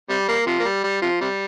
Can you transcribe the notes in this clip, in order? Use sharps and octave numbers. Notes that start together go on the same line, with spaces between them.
C3 G3
G3 A#3
C3 F3
A#3
G3
G3
C3 F3
C3 G3